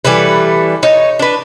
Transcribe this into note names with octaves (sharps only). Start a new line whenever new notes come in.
E3 G3 A3 B4
D#4 C#5
D4 B4